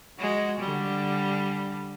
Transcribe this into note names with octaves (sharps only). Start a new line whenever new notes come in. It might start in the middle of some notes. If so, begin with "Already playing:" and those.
G#3 F#4
D3 G3